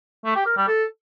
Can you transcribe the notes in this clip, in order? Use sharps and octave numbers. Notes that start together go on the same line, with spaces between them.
A3
G4
A#4
G3
A4